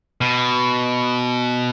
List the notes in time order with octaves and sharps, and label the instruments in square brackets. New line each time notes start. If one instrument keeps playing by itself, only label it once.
[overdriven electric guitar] B2